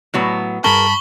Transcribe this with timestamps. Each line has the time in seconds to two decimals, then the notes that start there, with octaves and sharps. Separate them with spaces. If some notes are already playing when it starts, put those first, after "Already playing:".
0.14 A2 F#3 B3
0.64 G2 G#4 A#4 A5 B5 C#6 G7